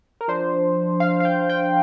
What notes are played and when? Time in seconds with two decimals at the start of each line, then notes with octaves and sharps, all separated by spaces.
0.21 A#4
0.28 F3 D4 C5
1.00 F5
1.20 F5
1.25 G5
1.49 G5